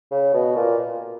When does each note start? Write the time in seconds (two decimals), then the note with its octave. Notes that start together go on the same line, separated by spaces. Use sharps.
0.11 C#3
0.34 B2
0.56 A#2